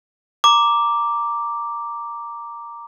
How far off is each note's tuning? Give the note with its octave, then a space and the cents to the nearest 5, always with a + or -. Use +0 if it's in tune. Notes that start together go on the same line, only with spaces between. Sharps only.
A#5 +0 D6 +0